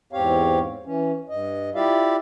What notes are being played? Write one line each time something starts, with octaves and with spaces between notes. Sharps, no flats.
E2 G#2 C4 G4 C#5 F5
E3 C#4
G2 D#5
E4 F4 G4 D5 E5 F5